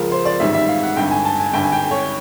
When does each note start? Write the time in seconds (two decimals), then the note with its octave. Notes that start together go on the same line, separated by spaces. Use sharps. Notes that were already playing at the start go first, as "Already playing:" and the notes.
Already playing: C#2 C#3 F3 A#4
0.12 C5
0.25 D5
0.40 A1 G#2 D#3 G3 E5
0.54 E5
0.68 F5
0.83 F#5
0.96 G#1 G2 D3 G5
1.11 G#5
1.25 A5
1.39 G#5
1.53 G#1 G2 D3 G5
1.64 G#5
1.72 G5
1.91 C#5